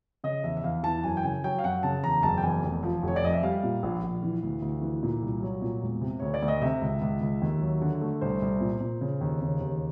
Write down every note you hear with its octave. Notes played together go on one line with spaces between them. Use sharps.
C#3 D#5
E2 E5
E5
E2 F5
E3 A5
F#2 G#5
G5
C#3 G#5
F#3 G5
F5
F#2 F#5
C#3 A5
E2 A#5
F#1 A5
G5
E2 G#5
F1
F3
F1
C#5
D5
F2 D#5
E5
G3 F5
A#2
A#1
A#1
E3
D2
D2
E3
A#2
C2
F#3
A#2
E1
C3
D2 C#5
D5
D2
D#5
C3 E5
C#2
C#2
C#2
D#2
F#3
D3
A3
C2 C5
C2
A#2
A#2
C#3
D#2
C#3
D#2